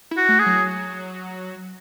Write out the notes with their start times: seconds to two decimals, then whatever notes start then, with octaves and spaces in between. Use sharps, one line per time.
0.11 E4
0.17 F#4
0.29 A3
0.39 G#4
0.46 F#3